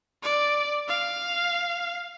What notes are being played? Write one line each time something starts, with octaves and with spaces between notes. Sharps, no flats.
D5
F5